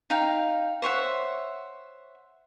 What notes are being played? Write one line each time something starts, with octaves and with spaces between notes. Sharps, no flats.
D#4 F5 G5
C5 C#5 E5 F#5